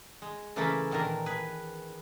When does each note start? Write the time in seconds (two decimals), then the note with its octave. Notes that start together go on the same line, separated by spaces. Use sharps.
0.22 G#3
0.56 C#3 E3 A3 A#3 E4 A4
0.91 A#2 D#3 E3 D4 A#4
1.26 G#4 B4